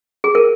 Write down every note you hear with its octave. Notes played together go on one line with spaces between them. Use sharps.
G#4
A#4